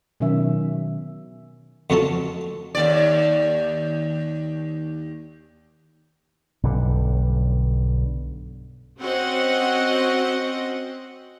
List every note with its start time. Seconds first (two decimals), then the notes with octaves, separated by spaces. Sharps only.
0.20 B2 D#3 F#3 C#4 E5
1.90 F2 F#3 G#3 C#4 A4 A5
2.75 D#2 D5
6.63 B1 G2 D3
9.01 C4 C#4 F#4 C5 D#5 F#5